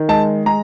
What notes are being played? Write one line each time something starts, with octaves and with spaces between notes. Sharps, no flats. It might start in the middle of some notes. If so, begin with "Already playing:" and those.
Already playing: D#3
G#3 A5
G#3 A#5